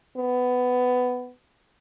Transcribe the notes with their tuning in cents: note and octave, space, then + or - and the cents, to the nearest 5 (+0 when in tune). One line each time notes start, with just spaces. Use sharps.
B3 +15